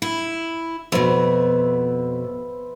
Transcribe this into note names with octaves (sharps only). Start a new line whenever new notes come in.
E4
F2 B2 B4 C5 E5